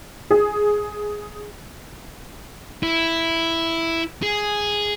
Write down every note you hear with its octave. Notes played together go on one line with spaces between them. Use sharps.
G#4
E4
G#4